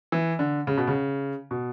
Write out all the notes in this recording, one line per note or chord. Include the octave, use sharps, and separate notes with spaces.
E3
D3
C#3
B2
C#3
B2